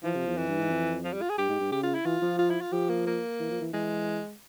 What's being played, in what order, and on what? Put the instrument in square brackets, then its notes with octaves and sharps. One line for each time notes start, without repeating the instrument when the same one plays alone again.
[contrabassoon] E3 [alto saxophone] F3
[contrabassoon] C3
E2
[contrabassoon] F2 [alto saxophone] E3
[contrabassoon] G2
G#2
F2
[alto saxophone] F3
G3
F4
G#4
[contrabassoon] G2 [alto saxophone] G4
[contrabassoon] G#2
G2
[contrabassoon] C#3 [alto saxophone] G4
[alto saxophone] F4
E4
[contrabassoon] E3 [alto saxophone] F4
[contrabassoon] F3
[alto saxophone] F4
E4
F4
[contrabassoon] F3 [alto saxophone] G4
[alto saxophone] A#3
A#3
[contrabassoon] E3
F3
E3
[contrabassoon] E3 [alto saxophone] G#3